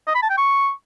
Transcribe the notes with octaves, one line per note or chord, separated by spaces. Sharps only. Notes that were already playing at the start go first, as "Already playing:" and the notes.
D#5
B5
A5
G5
C#6